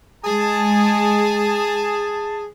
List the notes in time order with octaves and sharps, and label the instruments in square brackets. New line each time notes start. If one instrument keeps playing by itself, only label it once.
[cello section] G#3 [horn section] G#4 A5